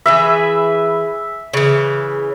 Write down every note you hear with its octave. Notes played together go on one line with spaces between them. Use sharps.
E3 G#4 B4 E5
C#3 E3